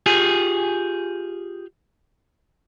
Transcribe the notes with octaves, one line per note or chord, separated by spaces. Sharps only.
F4 G4 G#4 G#5